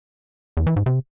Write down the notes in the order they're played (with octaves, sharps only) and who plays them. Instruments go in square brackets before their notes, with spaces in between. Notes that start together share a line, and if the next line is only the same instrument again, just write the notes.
[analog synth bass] E2
E3
G#2
C3